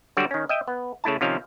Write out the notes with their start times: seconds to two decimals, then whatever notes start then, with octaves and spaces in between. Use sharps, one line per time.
0.17 D3 F#3 G3 F#4 D5
0.31 D#3 C#4
0.49 D#5 E5 G5
0.68 B3
1.04 C#3 A3 E4 A5
1.21 C3 D#3 F3 C#4 F5